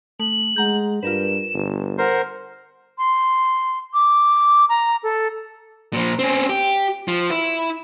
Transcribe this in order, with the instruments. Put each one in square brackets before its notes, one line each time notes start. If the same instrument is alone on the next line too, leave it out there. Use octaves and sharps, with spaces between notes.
[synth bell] A3 [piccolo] F#7
[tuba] G#3 [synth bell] F#5 A#5 G6
[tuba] G2 [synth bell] F4 A#4 B4 [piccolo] E7
[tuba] G1
[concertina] A#4 C5 [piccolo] F#5
[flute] C6
D6
A#5
A4
[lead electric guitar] A#2 F3
C4 C#4
G4
F3
E4